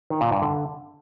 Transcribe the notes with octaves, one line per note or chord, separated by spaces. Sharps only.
D#3
A#2
G2
D3